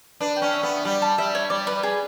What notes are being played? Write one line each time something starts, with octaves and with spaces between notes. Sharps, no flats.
D4 B4
G5
C#4
E5
B3
B4
G3 D6
A5
G3 E5
C#5
G3 D5
B4
G3
G#4